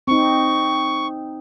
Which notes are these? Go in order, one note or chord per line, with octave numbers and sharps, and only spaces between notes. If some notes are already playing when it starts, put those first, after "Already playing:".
C4 D#4 C#6